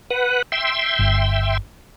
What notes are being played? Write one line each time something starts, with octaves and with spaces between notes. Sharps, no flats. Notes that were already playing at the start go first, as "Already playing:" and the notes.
B4 F#5
E5 G5 C6
G1